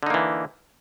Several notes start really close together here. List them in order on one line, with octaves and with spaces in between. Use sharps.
D3 D#4 A#3 E3